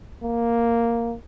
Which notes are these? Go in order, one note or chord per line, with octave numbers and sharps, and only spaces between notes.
A#3